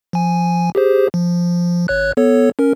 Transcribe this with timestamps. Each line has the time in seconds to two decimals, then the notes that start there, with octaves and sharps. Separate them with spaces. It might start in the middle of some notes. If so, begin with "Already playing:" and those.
0.13 F3 G#5
0.75 G4 G#4 C5
1.14 F3
1.88 G#1 C#5 F#6
2.17 B3 A4 C#5
2.59 C#4 A#4